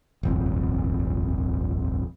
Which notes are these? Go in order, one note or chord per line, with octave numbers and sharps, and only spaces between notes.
D#1 G#1 F2